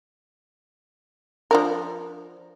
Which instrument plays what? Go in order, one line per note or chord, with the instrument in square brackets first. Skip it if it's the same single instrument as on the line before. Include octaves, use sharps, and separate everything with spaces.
[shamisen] F3 D4 A#4